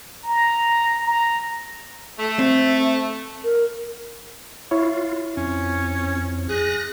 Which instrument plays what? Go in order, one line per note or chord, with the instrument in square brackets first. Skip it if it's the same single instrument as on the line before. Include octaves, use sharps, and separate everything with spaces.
[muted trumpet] A#5
A#5
[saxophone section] A3
[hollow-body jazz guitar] C4
[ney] A#4
[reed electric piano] E4 C#5 [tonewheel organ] F4
[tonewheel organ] F2 [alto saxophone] C#4
[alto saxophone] G#4 [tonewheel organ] F#6 A#6